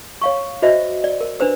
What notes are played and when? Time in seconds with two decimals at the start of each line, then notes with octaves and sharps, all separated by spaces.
0.21 C#5 F5 C#6
0.62 F#4 C5 D#5 E5
1.04 D5
1.21 A#4
1.40 D4 B4 C5 E6